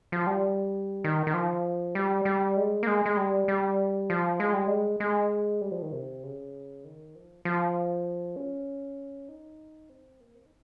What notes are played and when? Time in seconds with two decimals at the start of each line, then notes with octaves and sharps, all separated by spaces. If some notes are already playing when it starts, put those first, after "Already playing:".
0.12 F3
0.27 G3
1.04 D#3
1.27 D#3
1.34 F3
1.95 G3
2.25 G3
2.57 G#3
2.83 A#3
2.87 G#3
3.06 G#3
3.17 G3
3.48 G3
4.10 F3
4.40 G#3
4.53 G3
4.67 G#3
5.00 G#3
5.61 G3
5.72 F3
5.82 D#3
5.92 C3
6.23 C#3
6.84 D#3
7.15 F3
7.45 F3
8.36 C#4
9.29 D#4
9.89 C4
10.20 A#3
10.35 C4
10.46 D#4